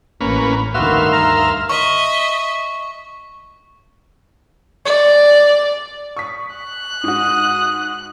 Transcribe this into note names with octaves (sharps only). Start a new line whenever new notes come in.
A1 A#3 C#4 B4
D2 G2 D#3 F#4 B4 E5 F5 C6
A#5 F6
D#5 E5 C#6
D5
C#6 D#6 B6
F#6
G#2 F#4 D#6